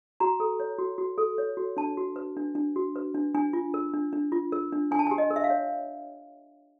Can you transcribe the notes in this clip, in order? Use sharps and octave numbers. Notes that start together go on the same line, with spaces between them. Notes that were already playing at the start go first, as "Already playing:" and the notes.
F#4 A#5
A4
C#5
F#4
F#4
A4
C#5
F#4
D4 A5
F#4
B4
D4
D4
F#4
B4
D4
D4 G#5
F4
A#4
D4
D4
F4
A#4
D4
D4 G#5
A5
G#5
G4
D#5
A#4
E5
F5
C#5